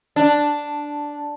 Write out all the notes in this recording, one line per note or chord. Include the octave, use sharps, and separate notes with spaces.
D4